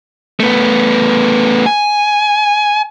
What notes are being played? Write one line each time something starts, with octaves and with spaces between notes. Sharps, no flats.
A3 B3
G#5